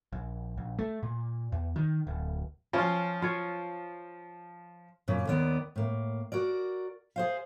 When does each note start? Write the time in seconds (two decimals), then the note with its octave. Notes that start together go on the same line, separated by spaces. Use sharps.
0.13 A#1
0.58 A#1
0.79 A3
1.03 A#2
1.52 E2
1.76 D#3
2.07 D1
2.73 F3 C#4 F4
3.22 F4 C#5
5.08 F#2 A#2 C#3
5.27 D#2 D#3 B3 D5
5.76 A2 A#3
6.32 F#4 A#4 D5
7.16 G#4 C5 F5